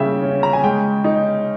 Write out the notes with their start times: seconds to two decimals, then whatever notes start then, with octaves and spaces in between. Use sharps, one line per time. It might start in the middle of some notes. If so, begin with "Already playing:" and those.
Already playing: C#3 G3 A#3 E5 G5
0.22 C#4
0.43 A#5
0.53 G#5
0.64 G#3 G5
1.04 D#4